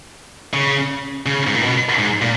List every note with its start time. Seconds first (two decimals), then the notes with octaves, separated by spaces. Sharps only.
0.54 C#3
1.26 C#3
1.47 G#2
1.55 A#2
1.62 B2
1.98 G#2
2.22 A#2